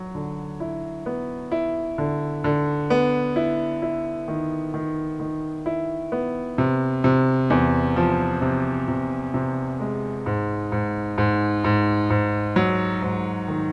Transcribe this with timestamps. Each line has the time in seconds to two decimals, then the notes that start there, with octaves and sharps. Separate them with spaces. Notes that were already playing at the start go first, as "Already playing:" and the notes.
Already playing: F#3
0.15 D3
0.60 E4
1.06 B3
1.52 E4
1.98 D3
2.44 D3
2.90 B3
3.36 E4
3.82 E4
4.28 D#3
4.74 D#3
5.20 D#3
5.66 E4
6.12 B3
6.58 C3
7.04 C3
7.50 E2
7.96 F3
8.42 C3
8.88 C3
9.34 C3
9.80 G#3
10.26 G#2
10.72 G#2
11.18 G#2
11.64 G#2
12.10 G#2
12.56 F#3
13.02 G#2
13.48 D#3